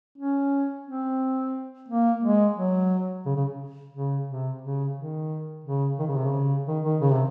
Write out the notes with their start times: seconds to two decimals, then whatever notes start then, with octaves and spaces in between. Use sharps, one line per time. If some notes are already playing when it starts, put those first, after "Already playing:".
0.18 C#4
0.86 C4
1.88 A#3
2.23 G#3
2.56 F#3
3.25 C#3
3.36 C#3
3.94 C#3
4.28 C3
4.62 C#3
4.95 D#3
5.64 C#3
5.99 D#3
6.07 C#3
6.16 C3
6.25 C#3
6.67 D#3
6.84 D#3
7.00 C#3
7.12 C3